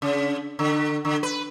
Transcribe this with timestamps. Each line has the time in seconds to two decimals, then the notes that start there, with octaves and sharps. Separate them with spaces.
0.02 C#3
0.59 D3
1.05 D3
1.23 B4